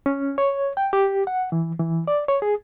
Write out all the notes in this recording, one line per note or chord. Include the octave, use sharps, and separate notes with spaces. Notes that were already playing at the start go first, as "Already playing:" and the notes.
C#4
C#5
G5
G4
F#5
E3
E3
D5
C#5
G#4